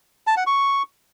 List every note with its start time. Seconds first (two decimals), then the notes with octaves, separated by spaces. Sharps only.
0.27 A5
0.37 F#5
0.47 C#6